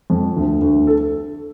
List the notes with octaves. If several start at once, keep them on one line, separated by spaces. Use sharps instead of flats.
F2
D2
D2
A4